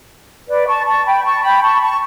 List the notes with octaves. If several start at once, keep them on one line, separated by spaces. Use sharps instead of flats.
B4 D5
A5 C#6
A5 C#6
G5 B5
A5 C#6
G5 B5
A5 C#6
A5 C#6